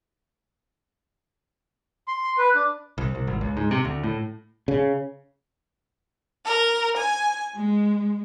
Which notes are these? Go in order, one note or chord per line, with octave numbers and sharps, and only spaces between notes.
C6
B4
D4
C2
C2
G#1
C#2
G#2
C3
D2
A2
C#3
A#4
G#5
G#3